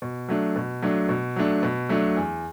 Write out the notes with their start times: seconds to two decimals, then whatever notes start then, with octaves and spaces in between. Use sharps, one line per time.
0.02 B2
0.29 F#3 A3 D4
0.56 B2
0.82 F#3 A3 D4
1.09 B2
1.36 F#3 A3 D4
1.63 B2
1.89 F#3 A3 D4
2.17 E2